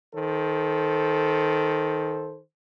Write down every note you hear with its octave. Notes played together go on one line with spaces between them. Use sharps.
D#3 A4 C5